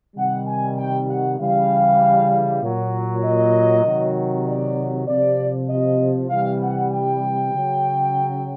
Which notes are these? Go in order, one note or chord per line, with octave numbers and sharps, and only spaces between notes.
C3 D#3 G3 F#5
G#5
G5
F#5
C#3 E3 G3 F5
A#2 F#3
D#5
C3 D#3 F#3
D5
C3 F3 D5
D#5
C3 E3 G3 F5
F#5
G5
C#3 F#3